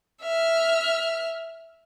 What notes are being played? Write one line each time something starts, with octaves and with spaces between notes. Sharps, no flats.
E5 F6